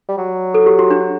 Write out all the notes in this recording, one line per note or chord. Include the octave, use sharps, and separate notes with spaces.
G3
F#3
A4
G4
F#4
D4